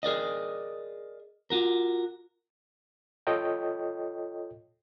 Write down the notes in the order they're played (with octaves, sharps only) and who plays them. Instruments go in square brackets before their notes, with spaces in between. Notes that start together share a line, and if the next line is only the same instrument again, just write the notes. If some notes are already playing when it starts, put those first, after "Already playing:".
[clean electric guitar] G#4 A#4 D5 D#5
F4 F#4 A#4
[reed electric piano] F4 A4 C#5 D#5 G5